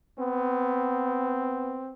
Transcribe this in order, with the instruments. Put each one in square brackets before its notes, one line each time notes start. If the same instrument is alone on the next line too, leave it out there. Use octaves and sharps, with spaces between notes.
[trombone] B3 [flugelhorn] C4